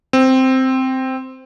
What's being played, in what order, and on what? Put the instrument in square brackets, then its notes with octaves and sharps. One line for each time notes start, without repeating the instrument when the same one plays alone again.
[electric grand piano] C4